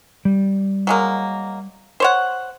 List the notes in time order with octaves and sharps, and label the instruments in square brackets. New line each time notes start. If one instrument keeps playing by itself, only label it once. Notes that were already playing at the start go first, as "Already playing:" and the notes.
[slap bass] G3
[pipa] F#3 G#3 A#3
C5 C#5 F#5